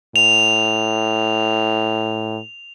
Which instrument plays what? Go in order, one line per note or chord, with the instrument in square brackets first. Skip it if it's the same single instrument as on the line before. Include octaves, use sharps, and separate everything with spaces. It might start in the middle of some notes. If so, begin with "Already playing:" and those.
[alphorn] A2 [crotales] F7